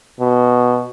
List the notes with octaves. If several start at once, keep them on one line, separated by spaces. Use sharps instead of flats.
B2